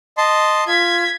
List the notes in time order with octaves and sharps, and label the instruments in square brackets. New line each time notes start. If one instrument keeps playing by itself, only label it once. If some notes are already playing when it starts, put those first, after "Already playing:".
[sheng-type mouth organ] D#5 A5 C6
[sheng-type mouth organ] F4 [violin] G#6 B6